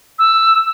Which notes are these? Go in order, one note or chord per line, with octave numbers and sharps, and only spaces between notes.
E6